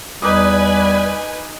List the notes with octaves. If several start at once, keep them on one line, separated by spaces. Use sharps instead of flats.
E2 G3 D#4 B4 G#5 D6 D#6